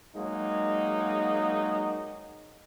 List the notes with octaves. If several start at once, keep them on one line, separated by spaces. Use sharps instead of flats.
F#3 G#3 A#3 D#4